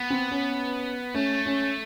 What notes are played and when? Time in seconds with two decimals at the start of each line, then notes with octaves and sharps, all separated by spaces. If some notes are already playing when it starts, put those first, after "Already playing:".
Already playing: B3
0.10 C4
0.31 C#4
1.14 A3 C#4
1.46 C#4